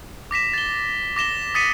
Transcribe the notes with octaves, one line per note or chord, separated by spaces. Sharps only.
D6 A#6 B6 E7
A6 G7
D6 A#6 E7 G7
D#6 A6 B6 C#7 D#7